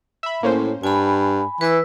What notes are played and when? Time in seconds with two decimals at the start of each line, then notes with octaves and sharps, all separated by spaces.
0.23 E5 B5
0.43 A2 A#3 C#4 C5
0.83 G2 G#5 B5
1.61 E3 B4 E6